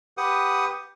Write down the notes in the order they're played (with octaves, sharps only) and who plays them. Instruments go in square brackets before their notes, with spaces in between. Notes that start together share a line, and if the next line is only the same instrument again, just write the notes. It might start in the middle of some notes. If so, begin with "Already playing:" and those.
[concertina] G4 B4 F#5 D#6